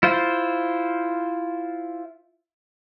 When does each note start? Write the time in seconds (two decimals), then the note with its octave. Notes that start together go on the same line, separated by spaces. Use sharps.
0.03 E4 F4 C5